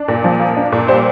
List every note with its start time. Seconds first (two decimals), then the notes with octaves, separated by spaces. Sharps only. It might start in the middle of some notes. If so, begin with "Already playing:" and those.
Already playing: D4
0.08 A#2
0.24 F3
0.40 A#3
0.57 D4
0.72 A#2
0.88 G3 C5